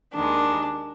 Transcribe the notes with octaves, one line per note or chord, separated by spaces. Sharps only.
D#2 D#3 G#3 D4